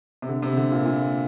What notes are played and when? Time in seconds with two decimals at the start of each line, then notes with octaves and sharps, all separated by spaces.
0.22 C3
0.29 D3
0.43 C3
0.57 D3
0.71 A#2
0.86 A#2